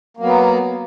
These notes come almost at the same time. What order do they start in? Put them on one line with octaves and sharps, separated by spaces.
A#3 F#3 B3